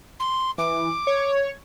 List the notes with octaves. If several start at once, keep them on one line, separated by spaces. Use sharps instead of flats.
C6
E3 D6
C#5